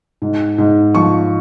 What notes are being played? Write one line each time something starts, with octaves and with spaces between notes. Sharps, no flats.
G#2
G#2
F3 C#6